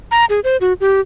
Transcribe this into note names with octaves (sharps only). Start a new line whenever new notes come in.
A#5
G#4
C5
F#4
G4